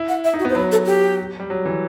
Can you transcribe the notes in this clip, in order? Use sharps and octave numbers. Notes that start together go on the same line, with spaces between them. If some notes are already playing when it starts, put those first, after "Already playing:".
Already playing: E4
F#5
E5
D#4
F#4
B3
C5
F#3 B4
A4
G4
G3
F#3
E3